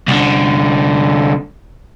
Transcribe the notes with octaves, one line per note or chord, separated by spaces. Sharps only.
C2 D3